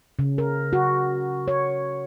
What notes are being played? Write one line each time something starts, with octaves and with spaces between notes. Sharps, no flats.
C#3
A#4
F#4
C#5